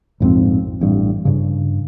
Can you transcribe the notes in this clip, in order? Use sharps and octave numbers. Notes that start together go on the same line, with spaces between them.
A#1 F2 G#2 C4
A1 G2
G2 C#3